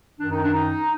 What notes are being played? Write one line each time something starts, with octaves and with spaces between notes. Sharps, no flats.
F#2 D#3 D4
D#4
D4
D#4